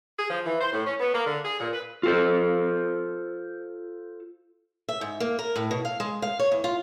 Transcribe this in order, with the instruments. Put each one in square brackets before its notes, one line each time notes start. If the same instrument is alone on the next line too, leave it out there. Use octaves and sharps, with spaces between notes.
[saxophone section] G#4
F3
E3
C5
A2
C#4
B3
A#3
D3
G#4
A#2
B4
[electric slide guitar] F4 A4 C5
[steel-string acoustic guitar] E5
G#2
A#3
A#4
A2
B2
F5
G#3
F5
C#5
E2
F4